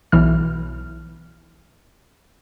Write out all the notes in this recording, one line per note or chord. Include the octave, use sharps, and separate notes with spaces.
B1 E3 F6